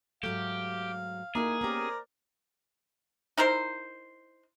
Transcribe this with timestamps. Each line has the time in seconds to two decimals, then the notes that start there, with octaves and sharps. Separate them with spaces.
0.23 G#2 F#3 A3 G4 F5
1.35 A3 A#3 D#4 E4 G#4
1.61 B3 C#4 G4 A#4 C5 D5
3.37 D#4 E4 A#4 C5